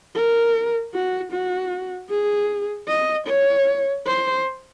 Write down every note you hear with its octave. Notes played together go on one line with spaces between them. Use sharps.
A#4
F#4
F#4
G#4
D#5
C#5
C5